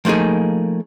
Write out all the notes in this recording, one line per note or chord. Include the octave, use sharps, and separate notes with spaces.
F3 A3 A#3 D#4 G#4